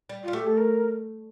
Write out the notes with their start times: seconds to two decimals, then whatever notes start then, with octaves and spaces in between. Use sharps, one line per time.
0.09 G3
0.24 G3 F4
0.33 A3 G4
0.47 A4
0.57 A#4